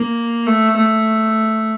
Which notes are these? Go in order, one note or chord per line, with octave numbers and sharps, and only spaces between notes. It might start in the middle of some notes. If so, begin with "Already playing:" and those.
Already playing: A#3
A3
A3